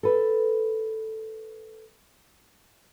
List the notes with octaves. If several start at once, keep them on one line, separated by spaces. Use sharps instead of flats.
A4 B4